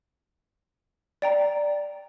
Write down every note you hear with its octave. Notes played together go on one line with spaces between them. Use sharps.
D5 G5 A#5